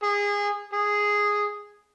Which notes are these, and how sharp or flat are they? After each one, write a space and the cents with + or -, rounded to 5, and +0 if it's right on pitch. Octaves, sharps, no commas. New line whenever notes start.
G#4 -25
G#4 -5